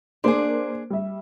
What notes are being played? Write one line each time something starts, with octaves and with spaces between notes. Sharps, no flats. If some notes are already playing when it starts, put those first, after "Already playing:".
A#3 D4 G#4 C5 C6
G3 E5